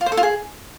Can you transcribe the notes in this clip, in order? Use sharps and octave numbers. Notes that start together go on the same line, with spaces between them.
F4
C5
A4
F4
G#4